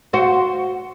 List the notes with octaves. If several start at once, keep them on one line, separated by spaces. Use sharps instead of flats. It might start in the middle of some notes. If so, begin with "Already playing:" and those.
F#4 C5